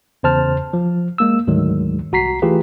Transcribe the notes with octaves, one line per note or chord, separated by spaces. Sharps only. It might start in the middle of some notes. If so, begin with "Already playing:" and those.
E2 C#3 C5 A5 F6
F3
G#3 A#3 E6
D2 G#2 D#3 F#3 G#3
C2 F#4 A#5 B6 C7
E3 A3 F4 G4 G#4 B4